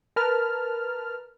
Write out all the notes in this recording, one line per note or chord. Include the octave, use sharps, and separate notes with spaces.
A#4 B4 A5 F6